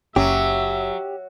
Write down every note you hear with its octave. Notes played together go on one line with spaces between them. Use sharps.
F#1 F#3 C#4 G4 E5